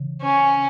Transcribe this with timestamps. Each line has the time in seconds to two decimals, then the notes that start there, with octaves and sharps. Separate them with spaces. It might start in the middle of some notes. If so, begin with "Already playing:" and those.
Already playing: C#3 E3
0.22 C#4